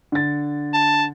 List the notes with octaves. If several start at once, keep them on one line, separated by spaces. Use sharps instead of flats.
D3 A6
A5